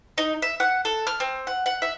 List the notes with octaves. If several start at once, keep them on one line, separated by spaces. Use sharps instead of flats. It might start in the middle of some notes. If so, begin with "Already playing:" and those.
D#4
E5
F#5
A4
F6
C4
F#5
F#5
E5